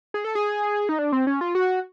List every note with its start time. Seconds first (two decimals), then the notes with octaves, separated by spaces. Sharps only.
0.14 G#4
0.25 A4
0.35 G#4
0.89 D#4
0.99 D4
1.12 C4
1.27 C#4
1.41 F4
1.55 F#4